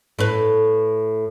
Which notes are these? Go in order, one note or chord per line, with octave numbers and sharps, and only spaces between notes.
A2 B4